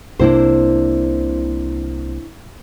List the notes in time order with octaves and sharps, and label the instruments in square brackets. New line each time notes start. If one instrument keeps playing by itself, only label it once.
[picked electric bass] C2 C3 A#3 [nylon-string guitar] D4 E4 C5